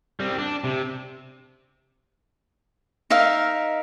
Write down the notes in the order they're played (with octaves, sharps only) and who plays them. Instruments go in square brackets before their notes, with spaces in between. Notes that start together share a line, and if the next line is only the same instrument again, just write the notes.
[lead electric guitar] G3 C4
D4
C3
[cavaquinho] D#4 A#4 E5 F5